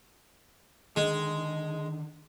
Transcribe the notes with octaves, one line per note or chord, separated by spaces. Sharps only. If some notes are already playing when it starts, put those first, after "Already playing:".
D3 D#3 G#3